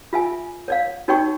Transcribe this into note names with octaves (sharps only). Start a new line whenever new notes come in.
F4 E5 G#5
C#5 D5 F5
D#4 F#4 C#5 D5 G5 C#6